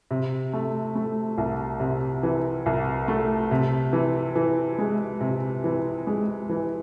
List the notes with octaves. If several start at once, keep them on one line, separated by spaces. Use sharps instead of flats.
C3
A3
A3
C2
C3
E3
C2
A3
C3
E3
E3
G#3
C3
E3
G#3
E3